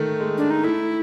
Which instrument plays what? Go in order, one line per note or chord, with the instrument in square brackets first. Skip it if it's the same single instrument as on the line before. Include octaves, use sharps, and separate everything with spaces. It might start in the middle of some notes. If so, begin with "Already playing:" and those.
Already playing: [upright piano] D#3 A3
G#3
[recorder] D4
D#4
[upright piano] A3 [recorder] E4